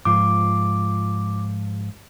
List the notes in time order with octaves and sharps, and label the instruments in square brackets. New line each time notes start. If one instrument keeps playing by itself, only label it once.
[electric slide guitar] G#2 F3 F4 [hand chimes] D6